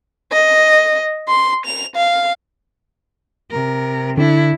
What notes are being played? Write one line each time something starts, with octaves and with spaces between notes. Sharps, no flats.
D#5
C6
F7
F5
C3 A#4
D3 D4 E4